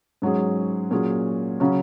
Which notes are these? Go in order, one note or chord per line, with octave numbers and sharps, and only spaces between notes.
G#2 F#3 C#4 G#4
A#2 F#3 C#4 G#4
C#3 F#3 C#4